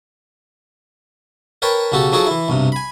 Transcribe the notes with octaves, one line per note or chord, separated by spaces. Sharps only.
A#4 B4 C#5 G5 A5
B1 C#3 F#4 G4 A4
F3 F#3 D#4 F#4 G#4 A4
E3 E4
B1 G2 C3
G#5 B5